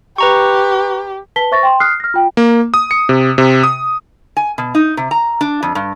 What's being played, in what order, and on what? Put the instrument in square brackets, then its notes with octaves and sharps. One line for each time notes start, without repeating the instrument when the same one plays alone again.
[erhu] G4 [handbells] B4 A#5 C#6
[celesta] B4 A5 B6 G7
C5 E5 C#6 A6 A#6
G5 C6
D#6 F6 F#6 C7
F6 A#6
F4 G5
[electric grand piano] A#3
D#6
C#7
C3
C3
D#6
[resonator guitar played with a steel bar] G#5
B2
D#4
C3
A#5
D4
F2
G2